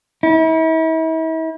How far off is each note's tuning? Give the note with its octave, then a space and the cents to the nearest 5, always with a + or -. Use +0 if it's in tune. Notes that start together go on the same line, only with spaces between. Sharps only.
E4 -40